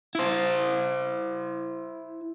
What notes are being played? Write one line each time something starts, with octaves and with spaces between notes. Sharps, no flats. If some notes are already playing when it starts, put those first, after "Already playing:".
E4 C5